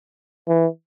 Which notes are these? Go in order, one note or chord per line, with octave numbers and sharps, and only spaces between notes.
E3